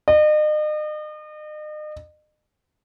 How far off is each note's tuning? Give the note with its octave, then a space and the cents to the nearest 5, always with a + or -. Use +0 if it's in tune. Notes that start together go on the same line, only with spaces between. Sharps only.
D#5 -40